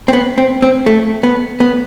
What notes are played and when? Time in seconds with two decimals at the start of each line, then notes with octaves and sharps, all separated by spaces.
0.08 C4
0.13 B3
0.38 C4
0.62 C4
0.86 A3
1.23 B3
1.60 B3